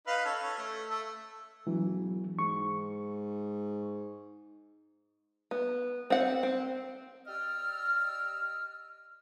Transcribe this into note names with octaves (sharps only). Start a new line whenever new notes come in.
D#4 B4 F5
C#4 A4
C#4 A4
A3
A3 E6
E1 E3 F#3
G#2 C#6
B3
C4 F#5
C4
G4 D5 D#5 E6 F6